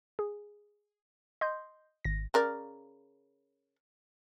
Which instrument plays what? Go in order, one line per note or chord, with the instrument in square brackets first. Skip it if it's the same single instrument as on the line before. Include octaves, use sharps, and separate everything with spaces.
[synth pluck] G#4
D#5 C6 G6
G#1 A#6
[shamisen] C#3 A#4 D5